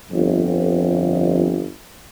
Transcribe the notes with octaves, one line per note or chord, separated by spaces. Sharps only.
G1 F2